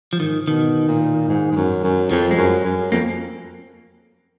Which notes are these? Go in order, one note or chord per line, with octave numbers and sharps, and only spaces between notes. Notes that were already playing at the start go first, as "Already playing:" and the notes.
F3
G#2 D#3
B2 D#3
A#2
G#2
G#2
F#2
F#2
F2 F3
G#3
F#2
F#2
F2 A#3